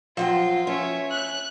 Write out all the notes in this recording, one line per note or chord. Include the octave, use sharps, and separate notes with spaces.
F3 F#3 F4 G5
C#4 C#5 E5
F#6